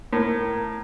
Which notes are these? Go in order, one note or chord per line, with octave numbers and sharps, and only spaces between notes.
A2 A#4